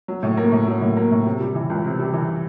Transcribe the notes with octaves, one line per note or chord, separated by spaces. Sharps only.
F#3
A2
A#3
A2
F#3
A2
A#3
A2
C3
G3
E3
C#2
C3
G3
E3